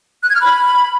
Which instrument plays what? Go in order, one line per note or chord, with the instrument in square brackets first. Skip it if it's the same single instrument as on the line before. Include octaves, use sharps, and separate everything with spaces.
[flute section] F#6
G#6
F6
B5